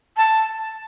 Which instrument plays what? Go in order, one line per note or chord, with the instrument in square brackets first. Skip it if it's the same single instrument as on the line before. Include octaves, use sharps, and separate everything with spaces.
[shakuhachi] A5